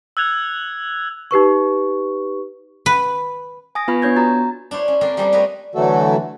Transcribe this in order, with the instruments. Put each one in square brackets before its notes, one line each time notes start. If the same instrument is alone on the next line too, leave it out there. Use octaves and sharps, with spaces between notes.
[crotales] E6 F#6 G#6 F7
[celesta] D#4 G4 B4 C#6
[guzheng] B4
[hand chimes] G#5 D#6 A#6
B3 F4 B4 G#5 B5 F6
B3 D4 C#5 G6 G#6
F#4 A#5 A6
[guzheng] D4 E4 C5 C#5
C#4
F3 A#3 C4 D4 A4
F3 G3 A#3 C4 D4 G#4
A3 A#3 B4 C#5 D#5
[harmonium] D3 E3 F#3 A3 F#4 A4